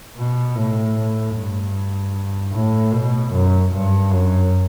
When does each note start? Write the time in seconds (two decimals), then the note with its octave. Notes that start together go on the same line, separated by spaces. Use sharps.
0.17 B2
0.55 A2
1.35 G2
2.53 A2
2.92 B2
3.32 F#2
3.72 G2
4.11 F#2